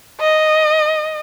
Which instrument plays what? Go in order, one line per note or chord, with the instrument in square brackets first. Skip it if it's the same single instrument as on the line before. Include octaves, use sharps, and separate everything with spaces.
[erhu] D#5